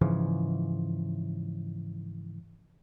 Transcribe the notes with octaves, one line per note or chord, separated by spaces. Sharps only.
G#2 C#3 E3 F3